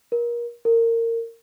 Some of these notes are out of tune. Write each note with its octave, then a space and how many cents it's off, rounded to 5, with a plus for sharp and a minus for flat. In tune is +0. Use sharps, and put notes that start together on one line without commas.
A#4 +30
A#4 -25